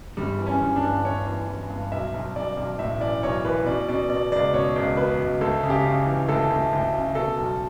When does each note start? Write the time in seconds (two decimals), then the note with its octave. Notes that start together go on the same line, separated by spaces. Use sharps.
0.17 G1 G3
0.38 E3
0.47 C#4
0.61 G1
0.76 D4
0.83 G2
1.05 G1 C#5
1.26 E3
1.48 E3
1.70 G2
1.91 B1 E5
2.14 B1
2.36 B1 D5
2.57 B1
2.79 A2 E5
3.00 E3 D5
3.23 B1 C#5
3.45 E3 B4
3.66 B2 D5
3.89 B2 D5
4.10 B2 D5
4.32 C#2 D5
4.54 B2 C#5
4.76 C#2
4.97 B2 B4
5.19 C#2
5.41 D2 A4
5.63 C#3
5.70 G4
5.85 C#3
6.06 E3
6.28 D2 A4
6.50 D2
6.73 D2
6.93 C#3
7.15 B2 A4
7.38 B1